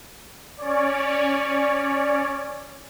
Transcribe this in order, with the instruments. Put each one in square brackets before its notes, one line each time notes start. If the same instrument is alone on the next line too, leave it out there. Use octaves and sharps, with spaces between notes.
[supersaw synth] C#4 C#5 D5